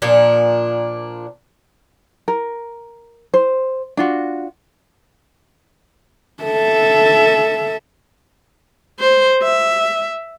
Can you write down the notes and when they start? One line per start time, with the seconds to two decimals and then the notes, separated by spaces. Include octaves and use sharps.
0.02 A#2 F3 D4
2.28 A#4
3.34 C5
3.97 D4 F4 F#4
6.43 A4 E5
9.00 C5
9.43 E5